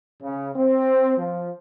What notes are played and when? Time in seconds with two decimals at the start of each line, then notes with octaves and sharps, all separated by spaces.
0.22 C#3
0.55 C4
1.18 F3